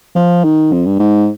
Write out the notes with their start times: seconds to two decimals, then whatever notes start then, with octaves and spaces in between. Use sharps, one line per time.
0.15 F3
0.44 D#3
0.72 F2
0.86 G2
0.99 G#2